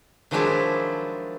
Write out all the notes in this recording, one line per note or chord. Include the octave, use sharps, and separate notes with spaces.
D#3 F3 F#3 G#3 D4 E4